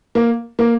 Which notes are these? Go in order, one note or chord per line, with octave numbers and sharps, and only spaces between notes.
A#3
A#3